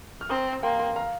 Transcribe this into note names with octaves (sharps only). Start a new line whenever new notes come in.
F6
C4 A#5 D#6
A#3 G5 C6
G5 C6
F5 A#5